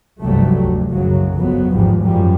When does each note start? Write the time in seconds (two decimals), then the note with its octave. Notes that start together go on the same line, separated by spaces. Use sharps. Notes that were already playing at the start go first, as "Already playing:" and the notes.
0.23 F1 C2 G2 F#3 G3 A3
0.64 D2
0.93 F#1 B1 F#2 C#3 F#3
1.35 G1 F2 F#3 B3
1.74 G#1 E2 G#2 F3 G3
2.04 F#2 F3 G3